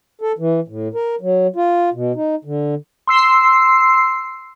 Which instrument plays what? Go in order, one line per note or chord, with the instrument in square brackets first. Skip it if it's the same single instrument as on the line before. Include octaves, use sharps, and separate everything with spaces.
[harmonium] A4
E3
A2
A#4
F#3
F4
B2
D#4
D3
[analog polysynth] C6 E6 C7